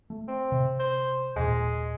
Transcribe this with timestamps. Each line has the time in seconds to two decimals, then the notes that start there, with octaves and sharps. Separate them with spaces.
0.10 A3
0.28 C4
0.52 C3
0.80 C5
1.36 D#1 A#2 G#3